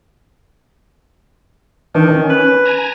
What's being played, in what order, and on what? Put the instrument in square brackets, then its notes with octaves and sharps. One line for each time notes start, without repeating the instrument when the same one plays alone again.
[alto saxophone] D#3 [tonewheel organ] E3 D4
[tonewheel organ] C#4
[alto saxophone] B4
[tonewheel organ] G#5 A#5